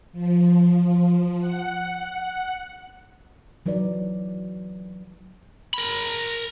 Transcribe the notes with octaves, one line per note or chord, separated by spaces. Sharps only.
F3
F#5
E3 F#3 D#4 B4 D5
A#4 B5